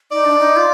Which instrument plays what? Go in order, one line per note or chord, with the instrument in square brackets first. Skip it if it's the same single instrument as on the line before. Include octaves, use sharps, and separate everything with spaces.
[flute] D#4 [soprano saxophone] D5
[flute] D4
D#4
F4